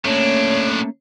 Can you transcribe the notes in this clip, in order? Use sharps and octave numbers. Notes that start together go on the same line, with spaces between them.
A2 A3 A#3 C#4 D4 C#5